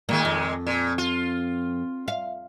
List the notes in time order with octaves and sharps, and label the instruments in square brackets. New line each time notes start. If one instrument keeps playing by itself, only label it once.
[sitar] A#2 D#3 G#3 [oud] A#3
[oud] F2
[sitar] A#2
F4
[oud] F5